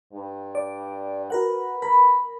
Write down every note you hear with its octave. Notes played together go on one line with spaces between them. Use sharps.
G2
D5
F#4 A#4 B4 F#5
A#4 B5